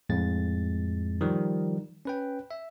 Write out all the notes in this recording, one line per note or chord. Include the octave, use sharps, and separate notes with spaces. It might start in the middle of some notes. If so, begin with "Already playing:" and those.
F2 A2 G#3 A6
D#3 F3 G3
C#4 B4 G5
E5